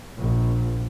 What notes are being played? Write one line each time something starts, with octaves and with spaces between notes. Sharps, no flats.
A#1